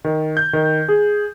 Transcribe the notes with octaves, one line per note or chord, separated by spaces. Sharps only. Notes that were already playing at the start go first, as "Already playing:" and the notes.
D#3
G6
D#3
G#4